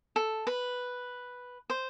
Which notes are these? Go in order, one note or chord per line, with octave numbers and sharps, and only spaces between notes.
A4
B4
C5